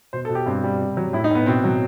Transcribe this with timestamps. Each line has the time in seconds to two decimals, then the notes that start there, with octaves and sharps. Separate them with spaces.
0.13 B2 C5
0.25 A4
0.29 B2
0.35 G4
0.46 G2 C4
0.64 G3
0.81 C3
0.97 F#3
1.13 A2 E4
1.24 D#4
1.31 A2 B3
1.46 B2 C4
1.64 F#3